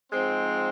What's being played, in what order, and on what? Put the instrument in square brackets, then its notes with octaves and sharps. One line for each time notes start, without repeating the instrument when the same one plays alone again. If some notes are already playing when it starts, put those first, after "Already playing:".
[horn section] G#2 F3 G#3 C4